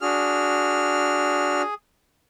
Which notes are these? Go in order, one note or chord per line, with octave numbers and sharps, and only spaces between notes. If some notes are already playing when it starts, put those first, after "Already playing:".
D4 F#4 G#4 F6